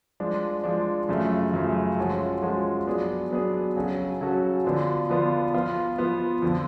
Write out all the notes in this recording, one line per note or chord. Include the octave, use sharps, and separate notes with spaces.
F3 G#3 D4
F3 G#3 D4
F#2 C#3 F3 A3
F#2 C#3 F3 A3
F3 G#3 C#4 F#4 A4
F3 G#3 C#4 F#4 A4
F#3 B3 D4 G#4
F#3 B3 D4 G#4
C#3 F#3 C#4 F#4 A4
C#3 F#3 C#4 F#4 A4
D3 F3 B3 D4 F4
D3 F3 B3 D4 F4
F3 B3 F4
F3 B3 F4
F2 D3 F3